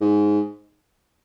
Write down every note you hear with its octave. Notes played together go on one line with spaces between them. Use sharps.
G#2